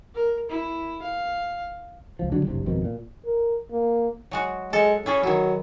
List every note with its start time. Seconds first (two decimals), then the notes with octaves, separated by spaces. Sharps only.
0.14 A#4
0.50 E4
1.02 F5
2.19 C#2 F3
2.32 D3 F#3 G3 D4
2.47 F#1 C2 G2 C3
2.66 G#1 F2 B2 D#3
2.85 A#2
3.25 A#4
3.71 A#3
4.31 F#3 G#3 F#4
4.73 G#3 A4
5.06 C#4 E4 G#4 A4
5.23 D#3 F#3 E4